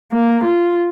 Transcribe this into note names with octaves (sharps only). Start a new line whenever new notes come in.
A#3
F4